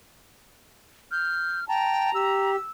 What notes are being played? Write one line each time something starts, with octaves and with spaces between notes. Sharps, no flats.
F6 G6
G5 A5 A#5
G4 E6